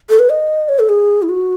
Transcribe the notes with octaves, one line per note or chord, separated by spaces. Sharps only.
A4
B4
D#5
C#5
A4
G#4
E4
F#4